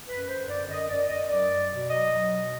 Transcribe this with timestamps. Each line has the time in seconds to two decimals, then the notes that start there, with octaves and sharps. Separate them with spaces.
0.08 F#2 B4
0.28 D3 C5
0.49 F#2 D5
0.68 F#2 D#5
0.89 F#2 D5
1.09 F#2 D#5
1.30 F#3 D5
1.49 F#3
1.69 B2
1.90 F#3 D#5
2.10 F#3
2.30 B2